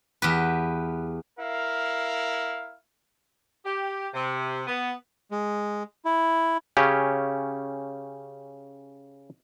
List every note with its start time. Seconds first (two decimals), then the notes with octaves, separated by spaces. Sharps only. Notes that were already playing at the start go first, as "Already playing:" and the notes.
0.22 E2 G4 B4
1.39 E4 A#4 F5
3.65 G4
4.14 C3
4.67 B3
5.31 G#3
6.05 E4
6.77 C#3 C#4 G4